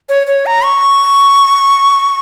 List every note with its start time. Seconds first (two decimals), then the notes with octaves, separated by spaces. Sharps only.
0.09 C#5
0.27 C#5
0.46 A#5
0.64 C#6